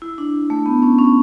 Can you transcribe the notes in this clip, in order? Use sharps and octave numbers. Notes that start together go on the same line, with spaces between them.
E4
D4
A3
B3
C#4
C#4